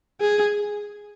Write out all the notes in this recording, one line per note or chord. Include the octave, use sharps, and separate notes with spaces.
G#4